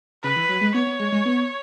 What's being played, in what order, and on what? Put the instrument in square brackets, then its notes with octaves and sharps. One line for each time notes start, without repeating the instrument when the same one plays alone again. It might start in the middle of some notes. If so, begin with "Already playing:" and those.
[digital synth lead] C#3 [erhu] B4
[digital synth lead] E3
F#3
G#3
[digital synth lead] B3 [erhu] C#5
[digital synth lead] B3
G#3
G#3
B3